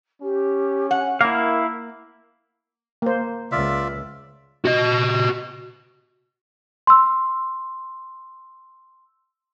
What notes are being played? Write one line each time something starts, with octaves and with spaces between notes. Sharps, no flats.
C#4 G4
F#5 G#5
A#3 E4 A#4 F5
A#3 C5
C#2 F4 D5 E5
F#4 D#5
C6 E6